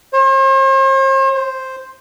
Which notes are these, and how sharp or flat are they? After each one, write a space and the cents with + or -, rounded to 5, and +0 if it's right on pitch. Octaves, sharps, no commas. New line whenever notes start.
C5 +45
C5 +0